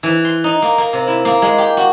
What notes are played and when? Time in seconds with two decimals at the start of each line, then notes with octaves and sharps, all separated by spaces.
0.03 E3
0.25 C6
0.44 D#4
0.62 A#3
0.78 A#3
0.93 C3
1.07 E4
1.25 A#3
1.42 G#3
1.58 G4
1.77 F#4